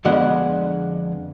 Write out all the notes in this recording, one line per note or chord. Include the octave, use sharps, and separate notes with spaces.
F2 D3 G#3 B3 F#5